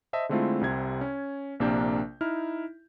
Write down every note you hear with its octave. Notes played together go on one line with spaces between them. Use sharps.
C5 D#5 E5 A5
D3 G#3 A3 C4 E4 F4
C2 C3 G#6
C#4
A#1 C3 A#3 D4 A#4 G6
D#4 E4 F6